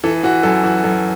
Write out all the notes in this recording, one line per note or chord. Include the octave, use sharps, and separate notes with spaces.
E3 A4
E3 F#4
F#2 A4
E3 F#4
F#2 A4